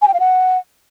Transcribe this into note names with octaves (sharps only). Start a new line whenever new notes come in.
G#5
G5
F5
F#5